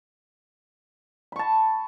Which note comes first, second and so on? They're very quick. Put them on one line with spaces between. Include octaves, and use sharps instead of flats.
B5 C#6 A5